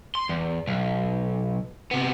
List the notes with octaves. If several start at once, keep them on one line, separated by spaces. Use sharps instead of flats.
C6
E2
B1
C3 B3